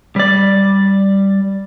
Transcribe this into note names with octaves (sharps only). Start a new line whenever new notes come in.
G3 D5